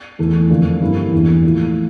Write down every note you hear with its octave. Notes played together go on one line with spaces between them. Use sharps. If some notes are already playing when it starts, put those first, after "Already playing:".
E2 E3 A3
F2 D3 F3 A#3
G2 E3 G3 A#3 E4
E2 E3 G3 A#3
A2 F3 A3 E4